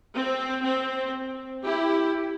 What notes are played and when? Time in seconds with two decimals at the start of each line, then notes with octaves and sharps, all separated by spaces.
0.14 C4
0.64 C4
1.64 E4 G4